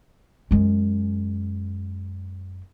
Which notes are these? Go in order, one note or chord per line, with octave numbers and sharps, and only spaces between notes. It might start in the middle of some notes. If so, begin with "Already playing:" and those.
F#2 G#3